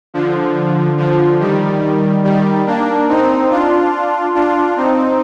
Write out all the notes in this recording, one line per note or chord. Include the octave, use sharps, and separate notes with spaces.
D3 F3
D3 F3
D#3 G3
D#3 G3
A#3 D4
C4 D#4
D4 F4
D4 F4
C4 D#4